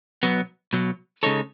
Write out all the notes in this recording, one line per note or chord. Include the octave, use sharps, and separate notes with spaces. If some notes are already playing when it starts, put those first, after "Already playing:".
B1 B2 F#3 B3
B1 B2 F#3
C#3 G#3 D#4 A4 C#5